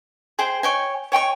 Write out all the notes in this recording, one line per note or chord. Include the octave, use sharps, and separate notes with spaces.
G#4 C5 G5
C#5 G5 G#5
C#5 G5 G#5 C#6